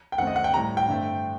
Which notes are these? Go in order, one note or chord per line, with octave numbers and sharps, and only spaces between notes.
G5
F#2 D#3 A3 C4 F#5
D#5
F#5
G5
A2 G3 C4 A#5
G5
G2 D3 A3 C4